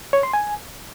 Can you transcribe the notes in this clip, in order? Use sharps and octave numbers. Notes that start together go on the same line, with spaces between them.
C#5
C6
G#5